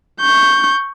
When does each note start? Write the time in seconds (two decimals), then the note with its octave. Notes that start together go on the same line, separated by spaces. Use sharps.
0.21 C#6 G6